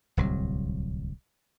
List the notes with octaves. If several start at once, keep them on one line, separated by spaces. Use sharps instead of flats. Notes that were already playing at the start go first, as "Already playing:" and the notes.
D1 C2 F#3